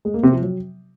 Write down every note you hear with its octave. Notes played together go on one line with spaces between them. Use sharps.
G#3
A#3
C3
F3
F#3